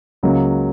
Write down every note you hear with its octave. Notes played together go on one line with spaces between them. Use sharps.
C#2 C#3 F#3 A#3